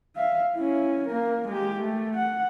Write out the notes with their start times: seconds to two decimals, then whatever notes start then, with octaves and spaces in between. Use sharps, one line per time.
0.17 E5 F5
0.56 C#4 E4
1.07 A#3 A#4
1.48 G#3 G4
1.80 A3
2.15 F#5